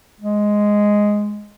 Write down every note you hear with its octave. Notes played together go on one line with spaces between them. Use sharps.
G#3